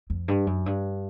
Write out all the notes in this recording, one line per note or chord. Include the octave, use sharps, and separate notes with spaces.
F2
G2
F#2
G2